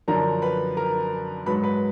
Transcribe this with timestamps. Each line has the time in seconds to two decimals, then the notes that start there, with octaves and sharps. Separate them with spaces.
0.08 F#2 D3 F3 A#4 A#5
0.42 B4 B5
0.77 A#4 A#5
1.46 G#2 F#3 B4 B5
1.64 B4 B5